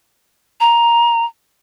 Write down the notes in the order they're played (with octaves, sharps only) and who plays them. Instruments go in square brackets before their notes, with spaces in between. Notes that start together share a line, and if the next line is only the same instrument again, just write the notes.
[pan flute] A#5